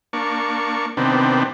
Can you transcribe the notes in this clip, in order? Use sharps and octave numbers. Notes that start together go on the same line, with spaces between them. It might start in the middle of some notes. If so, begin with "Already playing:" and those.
A#3 D4 C#6
C3 D#3 B3 C4 D4